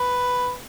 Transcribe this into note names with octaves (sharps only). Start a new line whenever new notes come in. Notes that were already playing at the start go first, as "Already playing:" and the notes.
Already playing: B4